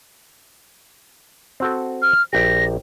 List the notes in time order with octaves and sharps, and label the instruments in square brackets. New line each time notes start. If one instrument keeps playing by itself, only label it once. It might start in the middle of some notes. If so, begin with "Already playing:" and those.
[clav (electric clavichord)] C4 F#4 A4
[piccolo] F6
[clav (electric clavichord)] A#1 G4 [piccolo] A#6